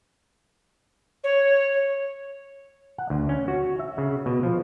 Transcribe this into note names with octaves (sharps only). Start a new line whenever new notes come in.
C#5
F#5
D2
C#4
F#4
E5
C#3
B2
F3